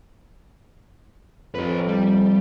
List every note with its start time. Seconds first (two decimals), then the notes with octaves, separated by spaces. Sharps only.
1.55 F2 A4 B4
1.88 G3